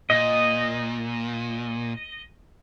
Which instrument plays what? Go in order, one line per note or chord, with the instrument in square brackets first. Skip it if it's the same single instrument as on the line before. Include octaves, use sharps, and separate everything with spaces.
[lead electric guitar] A#2 [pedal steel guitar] D#5